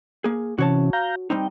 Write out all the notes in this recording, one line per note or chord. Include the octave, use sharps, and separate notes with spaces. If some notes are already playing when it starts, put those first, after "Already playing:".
A#3 G#4
C3 E3 C#4 F#4 C#5 A5
F5 A#5 G6
G3 C4 D#4 G5